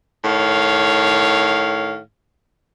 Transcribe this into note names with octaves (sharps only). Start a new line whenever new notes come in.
A2 D#3 C#5 F5